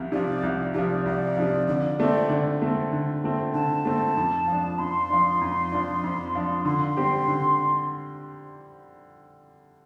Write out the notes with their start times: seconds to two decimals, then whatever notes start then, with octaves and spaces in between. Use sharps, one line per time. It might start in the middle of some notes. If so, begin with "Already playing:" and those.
Already playing: C2 C3 F3
0.12 C3 F3 D5
0.43 C2
0.74 C3 F3 D5
1.06 C2 D5
1.37 C3 F3
1.67 D3 D5
1.99 A3 C4 D5
2.29 D3
2.62 A3 C4
2.92 D3
3.24 A3 C4
3.54 D3 A5
3.85 A3 C4
4.17 F2
4.47 F3 D4
4.79 F2 C6
5.10 F3 D4
5.41 F2
5.72 F3 D4
6.04 F2
6.35 F3 D4
6.65 D3 C6
6.97 G3 C4 G4
7.28 D3